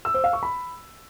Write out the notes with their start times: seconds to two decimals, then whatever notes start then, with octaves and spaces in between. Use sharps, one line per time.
0.05 E6
0.14 C5
0.24 F5
0.33 C#6
0.43 B5